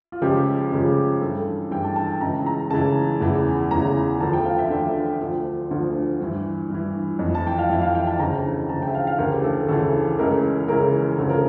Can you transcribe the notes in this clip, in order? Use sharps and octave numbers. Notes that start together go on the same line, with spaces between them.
F4
C#2 C#3 F3 G4
C#2 C#3 F3
G2 E3 A4
G2 E3 G5
A5
A5
A5
C#2 C#3 E3 A#5
A#5
C#2 C#3 E3 A5
E2 C#3 E3
E2 C#3 E3 A#5
D2 D3 F3 A5
G5
F5
E5
D2 D3 F3 D5
D2 D3 F3
D2 D3 F3
G2 E3
G2 E3
F2
E3
A5
G5
F5
F2 E3 E5
F5
G5
A5
D2 C#3 E3 A#5
D2 C#3 E3 A5
G5
E5
F5
F5
D2 C#3 E3 A#4
G4
A4
D2 C#3 E3 A4
C#2 C#3 E3 A#4
C#2 C#3 E3 A#4
D2 C#3 F3 A4
A#4